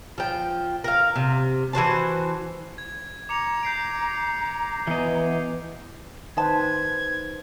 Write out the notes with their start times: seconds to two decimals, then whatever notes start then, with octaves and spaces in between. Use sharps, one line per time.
0.18 F3 G5
0.84 A#4 F5
1.16 C3
1.73 E3 F#4 C5 A5
2.78 G#6
3.29 A#5 D6 C#7 F7
3.63 G6 C7 D7
4.87 E3 B3 D#5
6.37 D#3 E3 B4 C5 G5 A5 G#6